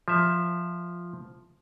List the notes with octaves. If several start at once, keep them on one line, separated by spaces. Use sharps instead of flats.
F3 E5